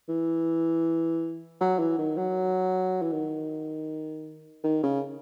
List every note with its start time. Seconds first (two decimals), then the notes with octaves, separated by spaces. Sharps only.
0.08 E3
1.61 F#3
1.79 E3
1.98 D#3
2.17 F#3
3.02 E3
3.12 D#3
4.64 D#3
4.83 C#3